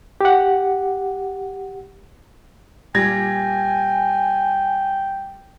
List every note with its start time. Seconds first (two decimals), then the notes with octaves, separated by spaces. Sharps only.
0.21 G4 F#5
2.95 A#2 G3 G5 G#5 G#6 A#6